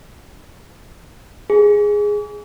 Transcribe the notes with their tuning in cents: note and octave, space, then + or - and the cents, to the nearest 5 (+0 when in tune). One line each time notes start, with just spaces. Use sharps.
G#4 -5